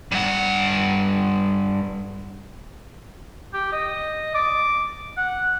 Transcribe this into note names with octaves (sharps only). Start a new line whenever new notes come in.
G2 F#5
G4
D#5
D6
F#5